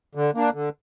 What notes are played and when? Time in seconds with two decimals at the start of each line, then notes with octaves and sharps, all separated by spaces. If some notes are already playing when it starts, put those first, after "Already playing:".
0.15 D3
0.35 A#3 D4
0.54 D3